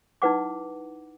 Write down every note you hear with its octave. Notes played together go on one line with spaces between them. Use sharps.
D#4 E4 B4 F#5 D6